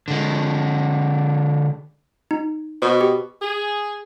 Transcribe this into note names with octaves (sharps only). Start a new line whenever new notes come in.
D3 G#3
D#4
B2 C5
G4
G#4